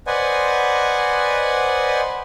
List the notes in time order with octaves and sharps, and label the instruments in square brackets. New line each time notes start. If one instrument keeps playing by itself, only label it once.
[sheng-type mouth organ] B4 C5 D5 D#5 F#5 G#5